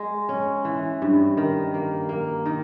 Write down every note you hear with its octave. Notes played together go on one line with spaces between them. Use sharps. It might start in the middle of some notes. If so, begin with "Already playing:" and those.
Already playing: G#3
C#4
E3
G2
D#3
A#3
A#3
D#3